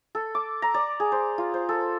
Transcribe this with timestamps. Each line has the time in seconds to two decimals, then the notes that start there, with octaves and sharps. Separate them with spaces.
0.15 A4
0.35 D6
0.62 A#5
0.74 D5
1.00 G#4
1.12 C5
1.38 F4
1.54 C5
1.69 A4